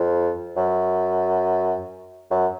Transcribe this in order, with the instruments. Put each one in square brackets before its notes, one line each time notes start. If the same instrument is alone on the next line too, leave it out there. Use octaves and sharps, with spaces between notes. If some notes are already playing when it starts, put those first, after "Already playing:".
Already playing: [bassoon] F2
F#2
F#2